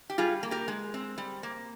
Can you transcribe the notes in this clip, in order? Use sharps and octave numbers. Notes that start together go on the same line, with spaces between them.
G4
G3 F4 G#4
A#3
G4 A#4
G#3
C4
G3
A#3